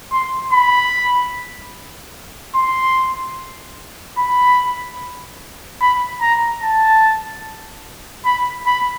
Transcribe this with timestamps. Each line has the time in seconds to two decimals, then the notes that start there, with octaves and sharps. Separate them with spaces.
0.12 C6
0.53 B5
2.55 C6
4.18 B5
5.82 B5
6.22 A#5
6.63 A5
8.26 B5
8.67 B5